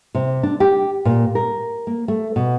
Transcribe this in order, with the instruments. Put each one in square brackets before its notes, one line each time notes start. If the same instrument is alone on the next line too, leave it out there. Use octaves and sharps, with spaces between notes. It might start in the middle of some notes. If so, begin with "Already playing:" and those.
[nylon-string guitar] C3
D4
G4
A#2
A#4
A#3
A3
B2